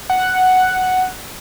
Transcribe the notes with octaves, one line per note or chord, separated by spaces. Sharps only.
F#5